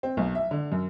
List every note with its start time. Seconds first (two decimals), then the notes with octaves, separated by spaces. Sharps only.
0.03 C4
0.17 B1
0.35 E5
0.51 D3
0.72 F#2